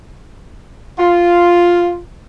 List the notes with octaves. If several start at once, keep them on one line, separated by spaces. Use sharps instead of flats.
F4